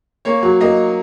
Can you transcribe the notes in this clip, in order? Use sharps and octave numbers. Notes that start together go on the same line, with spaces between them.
A#3 C#5
F#3
A#3 D#5